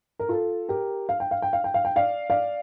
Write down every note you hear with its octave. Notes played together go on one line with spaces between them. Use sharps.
A#4
F4 A4
G4 A#4
F5
G5
F5
G5
F5
G5
F5
G5
D5 F5
D5 F5